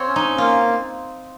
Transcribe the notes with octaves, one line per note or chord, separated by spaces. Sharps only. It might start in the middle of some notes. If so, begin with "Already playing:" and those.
Already playing: C4 F4 C#5
C#4
D#4
A#3 F4